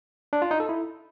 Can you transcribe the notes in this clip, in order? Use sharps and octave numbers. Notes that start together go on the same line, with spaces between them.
D4
F4
D#4
A4
E4